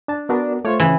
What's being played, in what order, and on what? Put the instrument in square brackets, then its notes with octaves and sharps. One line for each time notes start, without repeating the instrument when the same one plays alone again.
[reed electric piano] D4 A5
[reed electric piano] B3 F#4 A#4 [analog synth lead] D4
[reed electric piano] A3 F4 C5 [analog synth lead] C#5
[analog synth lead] C#3 [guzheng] E3